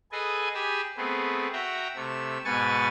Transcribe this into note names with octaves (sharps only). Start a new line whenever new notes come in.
G#4 A4 B4 D#5 G#5
G4 G#4 G#5 A5 B5
A3 B3 C4 G#4
F#4 E5 G5 A#5
C3 A3 E6
G#2 B2 B4 G#5 C#6 A6